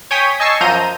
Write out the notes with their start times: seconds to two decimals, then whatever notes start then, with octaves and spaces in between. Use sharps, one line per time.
0.11 C#5 G5 G#5 D#6 B6
0.40 D#5 G#5 A5 C#6 E6 C7
0.61 F#2 F3 A#5 G6 D#7